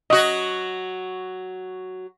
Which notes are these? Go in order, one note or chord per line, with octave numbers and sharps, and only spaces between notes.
F#3 F#4 D#5